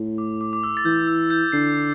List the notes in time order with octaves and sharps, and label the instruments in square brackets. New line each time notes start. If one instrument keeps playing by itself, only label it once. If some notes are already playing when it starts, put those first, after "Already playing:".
Already playing: [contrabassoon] A2
[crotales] D6
D6
D6
E6
A6
[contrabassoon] E3 [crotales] G6
[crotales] E6
G6
[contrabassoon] D3 [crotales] C7